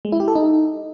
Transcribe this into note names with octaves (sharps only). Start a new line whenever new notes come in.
G#3
E4
G4
A4
D#4